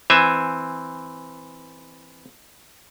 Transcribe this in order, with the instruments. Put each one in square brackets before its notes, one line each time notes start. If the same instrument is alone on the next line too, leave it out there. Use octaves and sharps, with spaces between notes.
[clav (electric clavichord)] E3 C4 E5 G#5